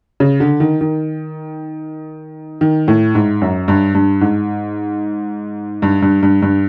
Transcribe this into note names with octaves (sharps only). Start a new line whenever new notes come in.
C#3
D3
D#3
D#3
D#3
A2
G#2
F#2
G2
G2
G#2
G2
G2
G2
G2